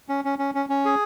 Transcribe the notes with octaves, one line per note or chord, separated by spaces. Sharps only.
C#4
C#4
C#4
C#4
C#4
G#4